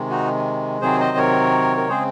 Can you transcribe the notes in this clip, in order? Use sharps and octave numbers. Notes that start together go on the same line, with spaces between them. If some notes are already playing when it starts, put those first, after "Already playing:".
Already playing: C3 D#3 G#3
D#4 F#4
C3 D#3 F#3 C4 G#4 C5
C5 D#5
A#4 C#5
A#4
C#3 G#3 C4 G#4 C5